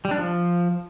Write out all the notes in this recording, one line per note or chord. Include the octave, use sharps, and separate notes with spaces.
G3
D4
F3